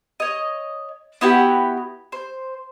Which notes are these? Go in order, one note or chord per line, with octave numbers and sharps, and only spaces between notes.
C#5 D#5
B3 E4 F#4 G4
C5